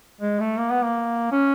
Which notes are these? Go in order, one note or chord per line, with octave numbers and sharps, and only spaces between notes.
G#3
A3
A#3
B3
A#3
C#4